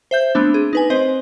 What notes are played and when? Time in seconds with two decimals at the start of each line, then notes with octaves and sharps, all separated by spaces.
0.11 C5 E5 G6
0.35 A3 B3 C4 D4
0.54 G#4
0.73 D#4 B4 G#5
0.90 C4 C5 D#5